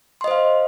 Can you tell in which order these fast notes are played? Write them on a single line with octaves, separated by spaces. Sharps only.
C6 D#5 C5 F5